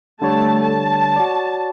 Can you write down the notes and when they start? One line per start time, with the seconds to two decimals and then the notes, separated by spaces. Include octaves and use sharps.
0.22 D3 G3 A3 C#5 A5
0.62 A5
1.16 F#4 C#5 D5